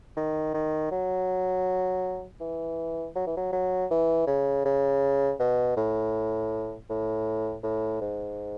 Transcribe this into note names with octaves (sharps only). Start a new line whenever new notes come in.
D#3
D#3
F#3
E3
F#3
E3
F#3
F#3
E3
C#3
C#3
B2
A2
A2
A2
G#2